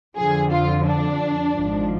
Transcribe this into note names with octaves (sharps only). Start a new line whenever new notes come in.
F2 D3 F3 G#4
F4
D4
G#1 G#2 F3